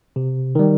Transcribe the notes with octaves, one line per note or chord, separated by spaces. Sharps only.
C3
D#3 G3